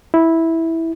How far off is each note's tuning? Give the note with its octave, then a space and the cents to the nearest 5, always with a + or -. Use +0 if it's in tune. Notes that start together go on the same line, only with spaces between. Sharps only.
E4 -10